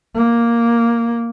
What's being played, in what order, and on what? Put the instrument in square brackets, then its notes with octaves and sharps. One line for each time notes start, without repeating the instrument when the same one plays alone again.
[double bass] A#3